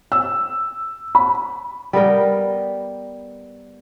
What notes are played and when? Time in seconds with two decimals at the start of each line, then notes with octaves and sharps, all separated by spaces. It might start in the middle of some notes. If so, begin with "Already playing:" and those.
0.12 E6
1.15 B5
1.93 G3 B3 A#4 G5